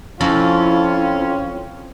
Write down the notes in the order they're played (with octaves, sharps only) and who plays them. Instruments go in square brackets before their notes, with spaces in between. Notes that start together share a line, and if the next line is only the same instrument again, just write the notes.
[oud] F2 [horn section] F3 C4 C#4 [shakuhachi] E4 [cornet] F4